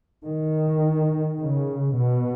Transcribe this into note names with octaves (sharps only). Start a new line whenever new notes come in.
D#3
C#3
B2